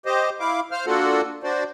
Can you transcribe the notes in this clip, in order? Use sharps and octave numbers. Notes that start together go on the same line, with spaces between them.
G4 C5 D#5
E4 F5 D6
C5 F5 F6
A#3 D4 F4 F#4 A4 F#5
D4 F#4 C5 D5